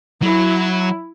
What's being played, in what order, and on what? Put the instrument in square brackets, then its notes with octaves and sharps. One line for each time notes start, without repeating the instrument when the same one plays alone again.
[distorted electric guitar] F#3 [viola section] E4